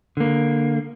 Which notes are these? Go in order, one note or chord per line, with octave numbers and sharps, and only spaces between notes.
D3 A#3